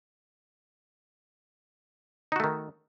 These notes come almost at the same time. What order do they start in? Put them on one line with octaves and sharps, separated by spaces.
D#4 F#4 A3 D#3